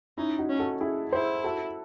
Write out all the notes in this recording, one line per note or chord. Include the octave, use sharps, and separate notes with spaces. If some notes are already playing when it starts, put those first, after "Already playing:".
C#4 D#4 E4
D#4 F#4
C#4
F#4 A4
E4 G#4
E4 G#4 C5
F#4 A4